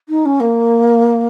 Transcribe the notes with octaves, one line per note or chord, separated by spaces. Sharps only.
D#4
C#4
A#3